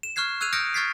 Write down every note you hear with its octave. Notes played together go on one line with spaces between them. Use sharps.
E7
C#6 F6 F#6 G#6 C7
E6 F#6 G#6 D#7 F7
D#6 F6 G6 A#6 C#7 D7
C#6 F6 G#6 A6 B6 C7